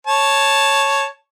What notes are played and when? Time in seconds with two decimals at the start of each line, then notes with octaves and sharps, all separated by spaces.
0.07 C#5 A5